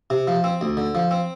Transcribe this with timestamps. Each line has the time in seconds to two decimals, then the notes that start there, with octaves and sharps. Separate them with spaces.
0.10 C3
0.27 F3
0.44 C4
0.61 D2
0.77 D3
0.95 F3
1.11 C4